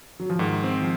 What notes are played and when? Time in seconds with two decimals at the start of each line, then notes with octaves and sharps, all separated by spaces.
0.20 F#3
0.30 F3
0.39 G#2 D#3
0.64 C4
0.82 F3